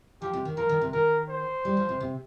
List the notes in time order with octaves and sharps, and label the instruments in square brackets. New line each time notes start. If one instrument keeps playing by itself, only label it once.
[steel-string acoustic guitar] F3 [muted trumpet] G4
[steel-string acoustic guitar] C3
D#3
[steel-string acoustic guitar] F3 [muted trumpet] A#4
[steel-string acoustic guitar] D#3
C3
[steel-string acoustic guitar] D#3 [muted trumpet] A#4
[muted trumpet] C5
[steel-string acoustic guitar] G3
F3
C3
C3